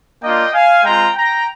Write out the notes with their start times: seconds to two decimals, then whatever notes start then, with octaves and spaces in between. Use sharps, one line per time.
0.22 A#3 D4 F4 D#5 G5
0.54 F5 G#5
0.84 G#3 C4 F4 G5 A#5
1.16 G5 A#5